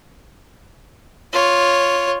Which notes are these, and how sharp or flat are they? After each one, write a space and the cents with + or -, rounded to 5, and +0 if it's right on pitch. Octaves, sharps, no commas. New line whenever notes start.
F4 +5 C#5 +0